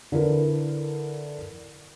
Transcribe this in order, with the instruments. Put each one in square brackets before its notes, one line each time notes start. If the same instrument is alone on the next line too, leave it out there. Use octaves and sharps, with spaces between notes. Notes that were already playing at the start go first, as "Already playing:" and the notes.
[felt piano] D3 E4 A#4 B4